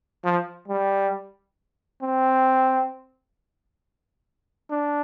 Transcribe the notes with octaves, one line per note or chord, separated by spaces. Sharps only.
F3
G3
C4
D4